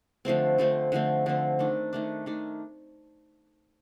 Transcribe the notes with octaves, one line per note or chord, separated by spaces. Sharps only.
D3 F3 A3 C4
D3 F3 A3 C4
D3 F3 A3 C4
D3 F3 A3 C4
D#3 A3 D4
D#3 A3 D4
D#3 A3 D4